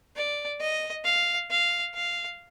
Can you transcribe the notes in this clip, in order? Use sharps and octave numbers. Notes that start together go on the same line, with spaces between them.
D5
D#5
F5
F5
F5